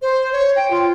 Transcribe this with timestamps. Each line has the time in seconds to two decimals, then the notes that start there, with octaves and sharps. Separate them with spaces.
0.02 C5
0.33 C#5
0.56 G5
0.71 F4